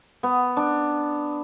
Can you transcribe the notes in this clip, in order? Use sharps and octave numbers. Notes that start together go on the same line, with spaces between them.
B3
D4